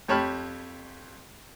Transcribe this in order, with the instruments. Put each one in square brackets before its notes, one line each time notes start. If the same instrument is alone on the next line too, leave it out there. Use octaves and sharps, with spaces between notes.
[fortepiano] F2 G4 C#5 A5 B5 F6